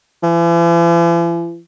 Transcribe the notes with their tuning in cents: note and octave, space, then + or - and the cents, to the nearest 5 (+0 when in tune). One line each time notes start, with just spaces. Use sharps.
E3 +45